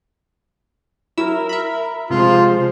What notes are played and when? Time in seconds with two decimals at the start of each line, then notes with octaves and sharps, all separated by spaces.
1.18 F#3 E4 A#4 E6
1.49 E5 B5
2.10 C3 F3 G#3 F4 C5